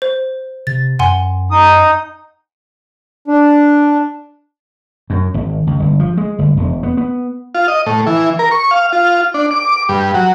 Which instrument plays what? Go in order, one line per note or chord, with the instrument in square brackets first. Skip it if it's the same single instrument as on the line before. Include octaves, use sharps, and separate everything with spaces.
[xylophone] C5
[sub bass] C3 [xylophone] A6
[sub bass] F#2 [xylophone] F#5 G#5 C6
[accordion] D#4 D#6
[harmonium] D4
[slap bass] F#2
G#1
C#2
G1
F3
G#3
G1
E1
B3
B3
[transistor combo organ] F4
D#5
A2
E3
A#4
C#6
F5
F4
D4
D6
G2
F#3